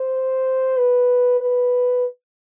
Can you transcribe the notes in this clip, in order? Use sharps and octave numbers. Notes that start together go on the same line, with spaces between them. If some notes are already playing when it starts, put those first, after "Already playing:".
Already playing: C5
B4
B4